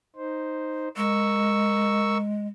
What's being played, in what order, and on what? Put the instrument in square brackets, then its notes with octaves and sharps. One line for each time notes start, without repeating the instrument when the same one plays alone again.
[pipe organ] D#4 C5
[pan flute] G#3 [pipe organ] A#4 C#6 E6